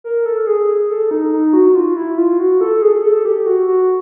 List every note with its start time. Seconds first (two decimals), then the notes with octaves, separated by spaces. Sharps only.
0.04 A#4
0.25 A4
0.47 G#4
0.89 A4
1.11 D#4
1.32 D#4
1.53 F#4
1.75 F4
1.96 E4
2.18 F4
2.40 F#4
2.61 A4
2.82 G#4
3.03 A4
3.25 G4
3.46 F#4
3.67 F#4